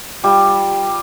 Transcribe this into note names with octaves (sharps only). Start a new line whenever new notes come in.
G3 F4